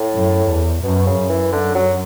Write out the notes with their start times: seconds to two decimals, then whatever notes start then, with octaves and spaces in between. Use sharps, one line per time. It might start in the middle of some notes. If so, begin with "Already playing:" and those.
Already playing: A2
0.15 F#2
0.49 E2
0.83 F#2 B2
1.06 C#3
1.18 F#2
1.29 E3
1.52 D3
1.74 F#3